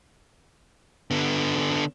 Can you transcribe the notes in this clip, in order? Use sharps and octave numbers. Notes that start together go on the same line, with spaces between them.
D3 B3